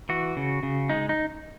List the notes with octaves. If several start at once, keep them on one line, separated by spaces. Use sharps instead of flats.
E3 F#4
C#3
C#3
G#3 D#4
D#4